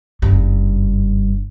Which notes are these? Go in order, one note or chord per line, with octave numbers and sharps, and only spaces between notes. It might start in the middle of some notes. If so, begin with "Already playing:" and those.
F#1 G2